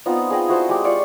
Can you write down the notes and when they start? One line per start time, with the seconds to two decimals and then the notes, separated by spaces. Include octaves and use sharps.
0.06 B3 C4 D#4 F4
0.31 G#4 D#5 G5
0.48 E4 F#4 C5 A5
0.69 G#3 G4
0.85 F4 D5 C6 C#6